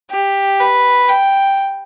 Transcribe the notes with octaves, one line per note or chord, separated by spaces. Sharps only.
G4
B4
G5